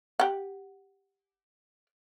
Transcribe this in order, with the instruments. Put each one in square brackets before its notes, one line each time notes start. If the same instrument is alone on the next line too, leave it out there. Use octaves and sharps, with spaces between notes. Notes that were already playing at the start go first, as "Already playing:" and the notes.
[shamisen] G4 F#5